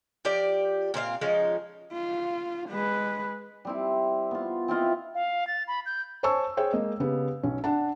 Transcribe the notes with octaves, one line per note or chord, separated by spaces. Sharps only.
F3 G4 D5
A#2 C4 D4 F5
F3 G#3 C#4 D#4
F4
G#3 B4
G3 C4 E4
B3 F4
C4 E4 F4 D#5
F5
A6
B5
G6
C5 C#5 G#5 A5 C#6 E6
G#4 C5 C#5 G5
G#3 A#3 D#5
C#3 B3 G4
B1 C#4
D4 F#5 A5